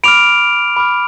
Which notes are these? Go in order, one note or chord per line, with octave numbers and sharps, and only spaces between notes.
B5 D6 F6 D7 F7
B5 D6 F6